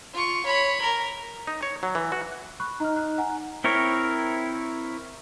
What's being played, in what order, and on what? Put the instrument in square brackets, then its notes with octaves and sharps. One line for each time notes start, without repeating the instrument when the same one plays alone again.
[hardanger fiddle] F4 C#6
C#5 B5
A#4
[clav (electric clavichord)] D#4
C#5
F#3
E3
F#4
[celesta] B5 C#6 F#6
[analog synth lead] D#4 [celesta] A#5 F6
[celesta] A#5 F#6
F#5 G#5 A#5
[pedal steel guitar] C4 E4 A#4 C#5